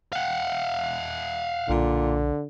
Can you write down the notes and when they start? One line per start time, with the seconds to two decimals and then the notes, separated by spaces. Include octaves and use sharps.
0.13 F5 F#5
1.69 B1 A#2 D3